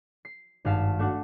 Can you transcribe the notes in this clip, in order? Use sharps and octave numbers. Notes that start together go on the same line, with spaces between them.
C7
G#1 G2 F5 A5 B6 E7
A3 D4 F#4 F#5